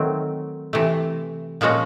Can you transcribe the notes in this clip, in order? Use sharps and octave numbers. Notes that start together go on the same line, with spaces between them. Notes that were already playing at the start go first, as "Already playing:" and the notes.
Already playing: D#3 F#3 A3 C4
C3 E3 A3
A#2 F3 G#3 C#4 F#4